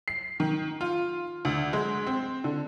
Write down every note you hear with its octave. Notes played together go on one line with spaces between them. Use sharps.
C7
D#3
F4
D2
G#3
C4
D3